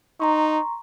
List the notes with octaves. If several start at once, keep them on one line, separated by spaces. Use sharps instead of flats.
D#4 A#5 C6 C#6